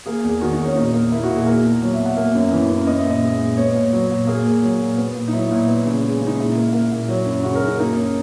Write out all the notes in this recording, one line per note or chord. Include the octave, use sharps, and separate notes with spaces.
A#3 G#4
E2
D#3 F#4
D#4
E2
C#4
A#2 D#4
A#3
A#3 E4
F#4
A#2
G#4
A#3 A#4
B2
F#3
B2 E5
F#5
A#3 E5
F#2
E3
F#2
B3 D#5
E5
A#2
D#5
G#3
A#2
B3 C#5
A#2
F#3
A#2
A#3 G#4
A#2
F#3
A#2
B3
A#2
D#4
F#3 E4
A#2
B3
C#3
G#3
C#3
D#4
A#2 E4
A#3
A#3
A#2
F#3
F#2
C#3 F#4
A#4
F#2
D#4
A#3 D#4
F#2